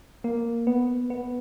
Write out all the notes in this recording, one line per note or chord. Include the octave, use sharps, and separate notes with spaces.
A#3
B3
B3